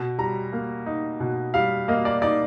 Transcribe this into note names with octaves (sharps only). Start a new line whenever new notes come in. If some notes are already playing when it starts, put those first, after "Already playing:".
Already playing: B2
G3 A#5
A#3
D#4
B2 F#5
G3 F5
A#3 D#5
D5
D#4 D5